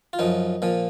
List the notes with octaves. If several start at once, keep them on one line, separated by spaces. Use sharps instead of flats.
F4
F#2 F3 D#4
A#2 F3